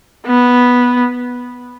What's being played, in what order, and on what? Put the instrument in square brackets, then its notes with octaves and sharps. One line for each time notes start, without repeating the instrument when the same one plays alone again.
[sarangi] B3